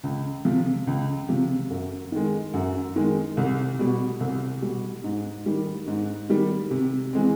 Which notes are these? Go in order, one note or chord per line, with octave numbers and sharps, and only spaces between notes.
C#2
C3 F3
C#2
C3 F3
F#2
D#3 G#3
F#2
D#3 G#3
C2
B2 G3
C2
B2 G3
G#2
D#3 G3
G#2
D#3 G3
C3
E3 G#3 C4